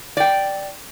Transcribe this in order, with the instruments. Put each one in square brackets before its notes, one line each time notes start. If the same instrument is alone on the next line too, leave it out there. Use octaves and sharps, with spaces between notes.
[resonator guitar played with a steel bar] D5 G5